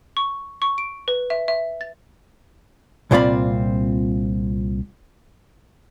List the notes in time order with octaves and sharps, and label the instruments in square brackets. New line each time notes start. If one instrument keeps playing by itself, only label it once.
[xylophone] C#6
C#6
D7
B4
E5
E5
A6
[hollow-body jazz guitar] C2 A#2 C4 F4 D5 B5